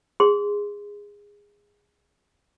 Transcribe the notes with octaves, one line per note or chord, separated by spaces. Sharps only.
G#4 C6